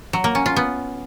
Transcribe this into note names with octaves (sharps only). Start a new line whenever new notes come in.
F#3
A#3
C#4
F4
B3